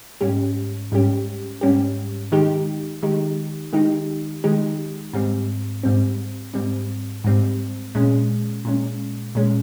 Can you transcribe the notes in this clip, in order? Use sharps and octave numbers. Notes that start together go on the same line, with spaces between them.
G#2 G3 C#4 G4
G#2 G3 C#4 G4
G#2 G3 C#4 G4
D#3 G#3 D#4 G4
D#3 G#3 D#4 G4
D#3 G#3 D#4 G4
D#3 G#3 D#4 G4
G#2 G3 C4
G#2 G3 C4
G#2 G3 C4
G#2 G3 C4
A#2 G#3 C#4
A#2 G#3 C#4
A#2 G#3 C#4